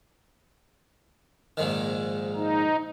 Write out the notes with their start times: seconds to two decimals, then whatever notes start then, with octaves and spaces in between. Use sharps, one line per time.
1.57 A#1 G#2 D#3
2.36 D#4